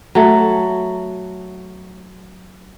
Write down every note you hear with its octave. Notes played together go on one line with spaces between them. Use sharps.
F#3 A3